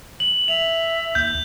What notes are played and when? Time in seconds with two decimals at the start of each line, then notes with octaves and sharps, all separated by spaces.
0.20 F#7
0.48 E5 F7
1.15 D#2 G6